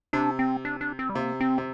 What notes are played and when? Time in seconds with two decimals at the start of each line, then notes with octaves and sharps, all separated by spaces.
0.13 C3 D4
0.39 C4
0.65 D4
0.81 D4
0.99 C4
1.10 G3
1.15 C3 A#3
1.40 C4
1.58 C3